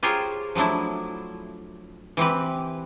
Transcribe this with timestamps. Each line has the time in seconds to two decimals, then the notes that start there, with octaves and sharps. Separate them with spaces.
0.03 F4 G4 G#4 A#4 C5 C#5
0.55 F3 F#3 A3 D4 E4
2.17 E3 C4 G4 B4